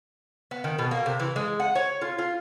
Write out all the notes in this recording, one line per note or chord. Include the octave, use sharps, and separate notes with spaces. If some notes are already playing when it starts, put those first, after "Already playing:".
B3
D#3
B2
A#3
C3
E3
G#3
F#5
C#5
F4
F4